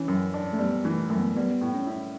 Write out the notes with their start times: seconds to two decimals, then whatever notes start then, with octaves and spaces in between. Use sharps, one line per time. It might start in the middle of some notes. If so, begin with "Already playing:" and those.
Already playing: E3 C#4
0.08 F#2
0.34 D4
0.53 A3
0.59 G3 B3
0.84 E3 A3
1.10 F#2 A3
1.18 B3
1.25 A3
1.36 G3 B3
1.61 A2
1.74 C#4
1.87 E4